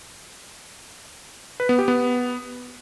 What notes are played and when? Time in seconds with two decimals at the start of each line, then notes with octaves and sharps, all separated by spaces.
1.60 B4
1.69 B3
1.78 G4
1.88 B3